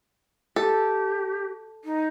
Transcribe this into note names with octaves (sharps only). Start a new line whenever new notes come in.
G4 A4
D#4